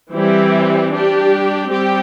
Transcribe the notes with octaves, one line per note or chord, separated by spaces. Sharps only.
E3 G3 C4 E4 G4
G3 D4 G4
G3 C4 G4